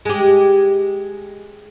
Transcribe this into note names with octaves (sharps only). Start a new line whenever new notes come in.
G#3 G4